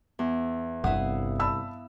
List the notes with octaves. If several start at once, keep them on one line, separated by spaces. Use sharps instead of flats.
E2
G1 C2 E4 F5 F#5 D#6
A5 B5 E6